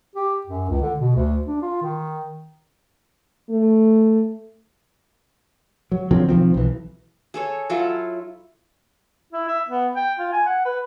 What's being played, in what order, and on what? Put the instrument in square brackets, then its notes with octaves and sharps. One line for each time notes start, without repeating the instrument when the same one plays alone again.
[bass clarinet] G4
F#2
C#2
D3
B2
D2
D4
F4
D#3
[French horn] A3
[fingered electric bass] F#3
D3 F3 F#3 C4
E1 D#3 F3 C4
B1 E3
[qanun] G#4 A4 C#5
F#3 E4 F4 A4
[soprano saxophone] E4
E5
B3
G5
F4
G#5
F#5
B4